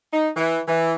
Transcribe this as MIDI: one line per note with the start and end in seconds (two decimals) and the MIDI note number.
0.13 0.29 63
0.36 0.60 52
0.68 0.95 52